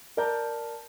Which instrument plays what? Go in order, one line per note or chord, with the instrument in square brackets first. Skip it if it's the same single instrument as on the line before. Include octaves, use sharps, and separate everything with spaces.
[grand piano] A#4 D5 A5 A#5 G6